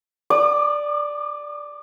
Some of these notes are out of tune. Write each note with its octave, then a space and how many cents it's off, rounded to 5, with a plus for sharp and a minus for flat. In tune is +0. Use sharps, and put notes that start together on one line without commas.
D5 +0 D#6 -45